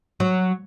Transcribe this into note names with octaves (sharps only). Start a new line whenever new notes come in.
F#3